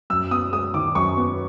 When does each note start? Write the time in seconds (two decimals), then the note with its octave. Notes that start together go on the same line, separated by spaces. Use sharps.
0.10 F#2 E6
0.31 B3 D#6
0.52 G#3 D#6
0.74 D#3 D6
0.95 F#2 C#6
1.17 B3